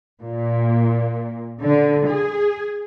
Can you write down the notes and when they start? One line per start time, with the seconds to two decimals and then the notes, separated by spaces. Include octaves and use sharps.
0.23 A#2
1.61 D3
2.07 G#4